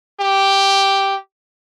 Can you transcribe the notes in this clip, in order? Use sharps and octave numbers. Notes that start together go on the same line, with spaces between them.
G4